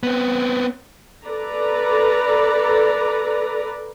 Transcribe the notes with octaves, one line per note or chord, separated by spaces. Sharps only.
B3 C4
A4 B4 D5 A#5